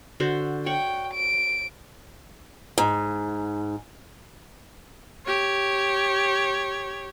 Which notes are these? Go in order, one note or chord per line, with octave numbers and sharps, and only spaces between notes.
D3 F#4 C5
C#5 F#5 G5
D7
G#2
G4 C#5